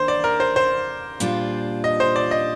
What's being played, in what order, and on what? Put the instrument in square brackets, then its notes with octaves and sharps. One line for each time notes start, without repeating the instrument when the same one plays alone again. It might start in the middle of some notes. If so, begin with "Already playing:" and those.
Already playing: [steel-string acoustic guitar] D#3 A#3 D4 [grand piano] C5
[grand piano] D5
A#4
C5
C5
[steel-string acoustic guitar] A#2 G3 D4 F4
[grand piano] D#5
C5
D5
D#5